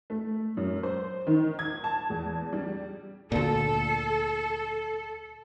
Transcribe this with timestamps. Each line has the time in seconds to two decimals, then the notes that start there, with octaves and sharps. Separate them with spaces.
0.10 A3
0.57 F#2
0.83 C5
1.27 D#3
1.59 G#6
1.84 A5
2.10 E2
2.53 G3
3.32 D2 A#2 A4